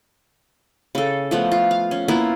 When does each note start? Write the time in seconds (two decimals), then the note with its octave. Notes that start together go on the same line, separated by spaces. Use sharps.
0.95 C#3 A4
1.31 F3 A3 B3
1.52 F4
1.71 F5
1.91 C#4
2.08 A#3 B3 E4 F4